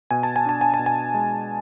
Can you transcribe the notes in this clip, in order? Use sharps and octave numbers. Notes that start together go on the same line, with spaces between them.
B2 G#5
A5
G#5
D4 A5
G#5
A5
B2
G#5
G#3